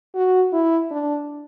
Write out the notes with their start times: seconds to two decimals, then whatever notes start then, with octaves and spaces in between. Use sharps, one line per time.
0.15 F#4
0.53 E4
0.91 D4